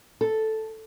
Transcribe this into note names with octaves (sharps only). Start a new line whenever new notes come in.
A4